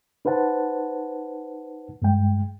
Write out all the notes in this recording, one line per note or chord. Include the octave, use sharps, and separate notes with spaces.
D#4 B4 C5 F#5 A5
G2 G#3 G5